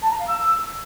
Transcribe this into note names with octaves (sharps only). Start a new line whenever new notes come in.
A5
A#5
F5
E6